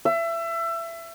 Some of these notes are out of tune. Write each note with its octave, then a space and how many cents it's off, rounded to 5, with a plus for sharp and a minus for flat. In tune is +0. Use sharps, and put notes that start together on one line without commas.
E5 +25